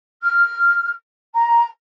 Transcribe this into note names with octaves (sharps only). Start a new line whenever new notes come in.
F6
A#5